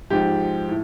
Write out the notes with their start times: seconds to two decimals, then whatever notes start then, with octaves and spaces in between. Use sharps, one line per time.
0.10 G#2 F3 G4
0.69 A2